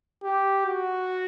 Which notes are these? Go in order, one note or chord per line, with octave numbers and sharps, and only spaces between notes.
G4
F#4